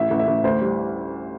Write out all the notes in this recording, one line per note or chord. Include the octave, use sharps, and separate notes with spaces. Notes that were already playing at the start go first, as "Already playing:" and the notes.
Already playing: A1 E5
A1
E5
A1
D2 C5
G3